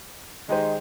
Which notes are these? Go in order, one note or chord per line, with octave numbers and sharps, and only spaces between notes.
D#3 G#3 G4 C5